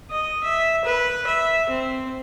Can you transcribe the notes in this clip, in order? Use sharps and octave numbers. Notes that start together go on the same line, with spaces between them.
D#5
E5
B4
E5
C4